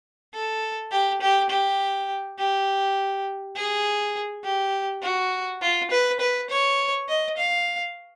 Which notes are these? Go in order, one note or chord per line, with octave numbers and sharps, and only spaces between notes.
A4
G4
G4
G4
G4
G#4
G4
F#4
F4
B4
B4
C#5
D#5
F5